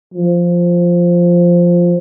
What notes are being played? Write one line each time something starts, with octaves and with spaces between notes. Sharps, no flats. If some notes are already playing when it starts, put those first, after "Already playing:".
F3